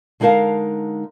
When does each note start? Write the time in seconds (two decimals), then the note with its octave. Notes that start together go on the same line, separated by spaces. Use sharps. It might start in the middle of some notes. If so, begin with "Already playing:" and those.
0.20 D3 G#3 D#4 A#4 F5 A5